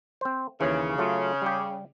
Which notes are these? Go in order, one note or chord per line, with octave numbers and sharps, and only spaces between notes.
C4 C5
D#2 C#3 E3
F#3 A3 F4
G3 G4